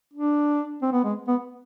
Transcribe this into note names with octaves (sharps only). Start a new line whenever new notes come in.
D4
C4
B3
G#3
B3